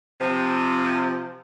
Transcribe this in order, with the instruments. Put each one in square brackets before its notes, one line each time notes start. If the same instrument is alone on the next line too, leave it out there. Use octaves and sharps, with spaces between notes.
[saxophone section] C3 F3